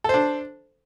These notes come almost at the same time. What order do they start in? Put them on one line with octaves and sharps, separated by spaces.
A4 C5 D4